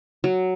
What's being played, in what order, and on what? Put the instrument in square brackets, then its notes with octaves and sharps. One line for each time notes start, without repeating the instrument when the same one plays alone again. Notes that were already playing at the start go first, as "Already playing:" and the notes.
[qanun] F#3